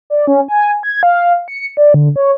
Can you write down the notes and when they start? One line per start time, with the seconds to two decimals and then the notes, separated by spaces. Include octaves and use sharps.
0.10 D5
0.27 C#4
0.48 G#5
0.83 G#6
1.03 F5
1.48 C#7
1.77 D5
1.94 D3
2.16 C#5